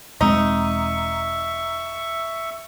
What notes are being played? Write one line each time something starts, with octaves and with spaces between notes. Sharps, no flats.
E1 G#3 C4 D#4 E5 C#6